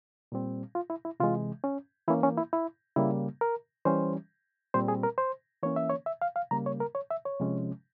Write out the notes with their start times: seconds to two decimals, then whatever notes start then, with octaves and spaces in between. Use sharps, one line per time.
0.32 A#2 G3 C4
0.75 F4
0.90 E4
1.05 E4
1.20 C3 E3 G#3 F4
1.64 C#4
2.08 E3 A#3 C#4 E4
2.23 C#4
2.37 E4
2.53 E4
2.96 C#3 G3 A#3 E4
3.41 A#4
3.85 E3 G3 C#4 C5
4.74 A#2 G3 C4 C5
4.88 G#4
5.03 A#4
5.18 C5
5.63 E3 A#3 C#4 C#5
5.76 E5
5.89 C#5
6.06 E5
6.22 F5
6.36 F5
6.51 C#3 G3 A#3 A#5
6.66 C#5
6.80 A#4
6.95 C#5
7.10 E5
7.25 C#5
7.40 C3 F3 G#3 C#4